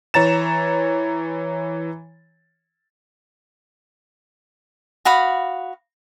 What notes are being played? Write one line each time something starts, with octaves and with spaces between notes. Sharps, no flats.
E3 C#5 A#5 A6 E7
F#4 F5 B5 D#6